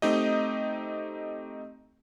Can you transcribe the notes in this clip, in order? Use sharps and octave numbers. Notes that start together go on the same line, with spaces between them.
A3 C4 D#4 G4 D#5